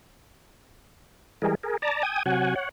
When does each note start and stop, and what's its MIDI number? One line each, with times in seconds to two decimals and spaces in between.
1.42 1.55 52
1.42 1.55 55
1.42 1.55 56
1.42 1.55 68
1.42 1.55 70
1.63 1.77 68
1.63 1.77 70
1.82 2.03 74
1.82 2.03 81
1.82 2.03 82
2.03 2.23 79
2.03 2.23 80
2.03 2.23 87
2.26 2.55 48
2.26 2.55 54
2.26 2.55 66
2.26 2.55 78
2.26 2.55 80
2.56 2.69 73
2.56 2.69 78